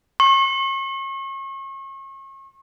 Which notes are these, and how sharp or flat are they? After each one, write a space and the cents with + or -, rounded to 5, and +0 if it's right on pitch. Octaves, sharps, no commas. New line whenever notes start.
C#6 -35